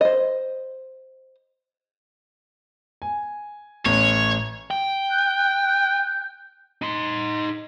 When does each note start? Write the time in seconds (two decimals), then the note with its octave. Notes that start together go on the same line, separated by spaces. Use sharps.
0.01 C5 D#5
3.02 G#5
3.86 A1 C#5
4.71 G5
5.09 F#6 G6
6.82 D#4 C6